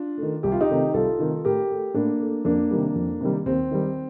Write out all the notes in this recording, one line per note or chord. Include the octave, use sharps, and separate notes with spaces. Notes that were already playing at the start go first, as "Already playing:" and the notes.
Already playing: D4 F4
D#3 A3
C2 G4
F4
D#4 G4
C3 D#3 A3
C2 F4 A4
C3 D#3 A3
A2 G4 A#4
A3
A2 A#3 D4
A3
F2 A#3 D4
C3 D#3 G3
F2
C3 D#3 G3
D#2 C4
D#3 G3